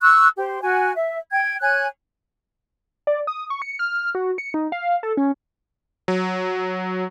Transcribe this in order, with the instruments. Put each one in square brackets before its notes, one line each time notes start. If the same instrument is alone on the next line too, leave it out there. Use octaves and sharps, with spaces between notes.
[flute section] C#6 E6 F#6
G4 C5
F#4 G#5
E5
G5 G#6
C#5 G#5 F#6 G#6
[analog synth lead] D5
D#6
C#6
C#7
F6
F#4
C#7
D#4
F5
A4
C#4
[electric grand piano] F#3